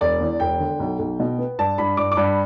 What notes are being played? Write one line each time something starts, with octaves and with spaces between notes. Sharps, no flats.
E1 D5
E2
E1 G5
D3
B1
B1
B2
B3
G2 A5
G2 B5
G2 D6
D6
G2
B5